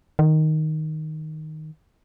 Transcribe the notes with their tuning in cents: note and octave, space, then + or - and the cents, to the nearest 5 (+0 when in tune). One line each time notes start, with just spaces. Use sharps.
D#3 +0